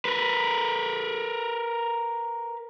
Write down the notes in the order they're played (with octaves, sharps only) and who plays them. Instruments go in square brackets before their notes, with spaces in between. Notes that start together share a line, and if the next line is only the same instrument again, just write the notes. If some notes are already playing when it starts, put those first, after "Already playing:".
[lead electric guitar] A#4 B4